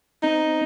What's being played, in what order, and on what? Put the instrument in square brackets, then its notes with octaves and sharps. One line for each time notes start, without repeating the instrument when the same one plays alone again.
[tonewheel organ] C4 [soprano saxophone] D#4